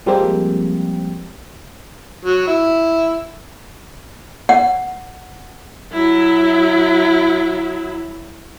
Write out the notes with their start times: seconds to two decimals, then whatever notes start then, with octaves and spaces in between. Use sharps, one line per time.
0.06 F3 G3 G#3 A#3 C4 G4
2.25 F#3
2.47 E4
4.49 F#5
5.93 F#3 E4